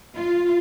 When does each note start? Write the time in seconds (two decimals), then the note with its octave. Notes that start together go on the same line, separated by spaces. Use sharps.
0.14 F4